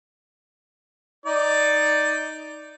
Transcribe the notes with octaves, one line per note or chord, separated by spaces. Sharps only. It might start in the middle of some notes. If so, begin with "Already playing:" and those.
D#4 D5